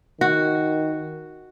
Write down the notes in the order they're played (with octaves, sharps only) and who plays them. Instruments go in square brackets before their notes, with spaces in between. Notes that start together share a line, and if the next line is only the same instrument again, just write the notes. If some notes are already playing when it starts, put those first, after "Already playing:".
[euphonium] D#3 [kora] F#4